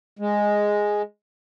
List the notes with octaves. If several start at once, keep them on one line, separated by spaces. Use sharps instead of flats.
G#3